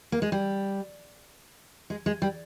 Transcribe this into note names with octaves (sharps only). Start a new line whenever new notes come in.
A#3
G#3
G3
G#3
G#3
G3